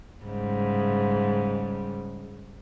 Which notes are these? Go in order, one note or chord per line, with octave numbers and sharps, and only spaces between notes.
G#2 C#3 G3